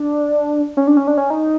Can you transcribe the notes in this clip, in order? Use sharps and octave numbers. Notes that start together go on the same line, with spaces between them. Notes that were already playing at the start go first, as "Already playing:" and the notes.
Already playing: D4
C#4
D4
C#4
D4
C#4
D#4